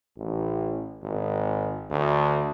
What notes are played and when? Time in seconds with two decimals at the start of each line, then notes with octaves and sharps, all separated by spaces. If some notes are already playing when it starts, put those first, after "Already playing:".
0.17 A1
1.03 G#1
1.90 D2